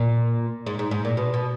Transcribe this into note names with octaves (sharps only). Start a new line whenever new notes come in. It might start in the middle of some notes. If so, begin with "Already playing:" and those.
Already playing: A#2
G#2
G#2
G#2
A#2
B2
B2